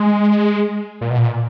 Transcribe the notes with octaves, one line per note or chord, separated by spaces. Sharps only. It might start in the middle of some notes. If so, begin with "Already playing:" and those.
Already playing: G#3
A#2
B2
A#2